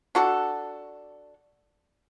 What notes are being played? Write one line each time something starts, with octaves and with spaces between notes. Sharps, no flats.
D4 F#4 A4